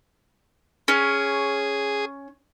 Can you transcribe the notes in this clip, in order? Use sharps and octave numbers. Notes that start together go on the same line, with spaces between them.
C#4 G#4